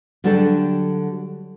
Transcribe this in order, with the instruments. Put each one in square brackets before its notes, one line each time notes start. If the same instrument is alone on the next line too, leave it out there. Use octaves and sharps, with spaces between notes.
[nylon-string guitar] D3 F#3 G3 D4 G4 A4